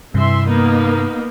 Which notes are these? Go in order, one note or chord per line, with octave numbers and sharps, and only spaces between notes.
G2 C3 E3 E5 C6
A#3 B3 D#4